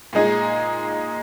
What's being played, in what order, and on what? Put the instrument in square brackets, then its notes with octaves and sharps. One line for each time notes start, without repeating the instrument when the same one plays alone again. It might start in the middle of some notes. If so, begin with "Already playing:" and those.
[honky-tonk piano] A#2 G#3 D#4 G#4